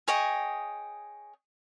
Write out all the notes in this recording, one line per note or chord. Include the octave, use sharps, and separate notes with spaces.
G#4 C#5 D#5 G5